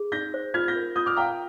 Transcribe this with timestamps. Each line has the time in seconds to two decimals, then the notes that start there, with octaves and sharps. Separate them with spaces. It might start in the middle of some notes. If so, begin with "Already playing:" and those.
Already playing: G#4
0.12 D#4 G6 A#6
0.34 C5
0.54 F4 F6 G#6
0.68 G6 A#6
0.76 A#4
0.95 F4 D#6 G6
1.06 D6 F6
1.16 F5 G5 A#5